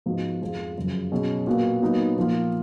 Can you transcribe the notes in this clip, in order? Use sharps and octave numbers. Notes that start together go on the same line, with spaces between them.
G#2 F3 B3 D#4 F#4
F2 F3 G#3
F#2 C#3 F3
B2 F#3 C#4 G#4
A#2 F#3 B3 F#4
A#2 F#3 B3 D#4
A#2 F3 A#3 F4